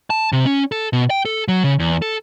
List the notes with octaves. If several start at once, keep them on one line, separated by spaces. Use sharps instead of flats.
A5
C3
C#4
A4
B2
G5
A4
F#3
C#3
E2
A4